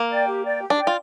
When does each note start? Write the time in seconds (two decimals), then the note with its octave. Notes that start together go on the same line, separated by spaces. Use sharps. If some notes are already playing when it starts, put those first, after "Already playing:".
Already playing: A#3
0.11 D5 G5
0.27 G4
0.45 D5 G5
0.61 G4
0.70 D4
0.78 D5 G5
0.87 F4